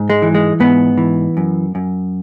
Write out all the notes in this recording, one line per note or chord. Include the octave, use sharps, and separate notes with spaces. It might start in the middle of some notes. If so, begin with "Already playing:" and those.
Already playing: G#2
G#3
E3
G#3
G#2 B3
E3
F#2
F#2